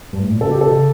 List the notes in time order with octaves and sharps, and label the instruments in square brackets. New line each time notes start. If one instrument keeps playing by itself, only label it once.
[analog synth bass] G2
A2
A#2
[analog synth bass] C#3 [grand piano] A4
[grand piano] G4
A4
[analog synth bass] C#3